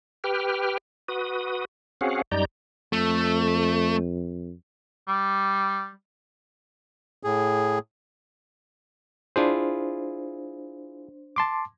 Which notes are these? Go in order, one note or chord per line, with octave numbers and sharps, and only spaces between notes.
G4 B4 G5 F6
F#4 B4 D#6
C4 C#4 F#4 G#4 F5 F#5
F#2 G3 D#4 D5 A#5 G6
F2 A3
G3
A2 G#4
D4 E4 F4 G#4 C5
A5 C6 D6